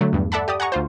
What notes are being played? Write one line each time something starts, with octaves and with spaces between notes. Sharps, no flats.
D3 F#3 A3
E2 G2
A4 D5 E5 F#5 A5 B5
G4 D5 D#6
F#5 G#5 A#5 C#6
D2 F4 C5